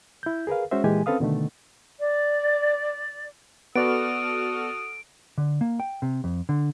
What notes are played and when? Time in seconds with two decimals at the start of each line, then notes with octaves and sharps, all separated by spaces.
0.23 E4 G6
0.47 G#4 A#4 B4 F5
0.71 G#3 C#4 F#4 C5 E5
0.84 A#2 E3 G#3 G4 G#5
1.06 C4 C#4 A4 B4 F5 D#6
1.20 B2 D3 D#3 A3
1.99 D5
3.76 B3 F#4 A4 D5 C#6 D#6 F6 D7
5.38 D3
5.61 A#3
5.80 G5
6.02 C3
6.24 F2
6.49 D3